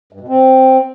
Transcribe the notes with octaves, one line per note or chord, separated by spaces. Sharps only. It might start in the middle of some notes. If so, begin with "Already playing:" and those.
G2
B2
C4